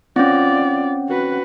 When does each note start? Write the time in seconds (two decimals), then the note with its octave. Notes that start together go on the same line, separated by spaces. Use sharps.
0.16 C4 C#4 F4 D5
1.08 F#4 B4